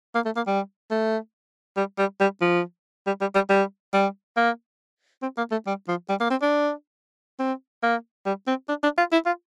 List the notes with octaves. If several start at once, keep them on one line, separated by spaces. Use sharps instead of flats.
A#3
A3
A#3
G3
A3
G3
G3
G3
F3
G3
G3
G3
G3
G3
A#3
C4
A#3
A3
G3
F3
G3
A#3
C4
D4
C4
A#3
G3
C4
D4
D4
F4
E4
F4